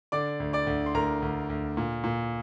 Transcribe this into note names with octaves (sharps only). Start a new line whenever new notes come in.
D3 D5 D6
D2
D5 D6
D2
C6
D2 A#4 A#5
D2
D2
A#2
A#2